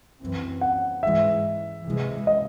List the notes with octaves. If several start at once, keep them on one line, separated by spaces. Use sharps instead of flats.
F#2 E3 C4
F#5
G#2 E3 G#3 E5
C3 E3 G#3
D#5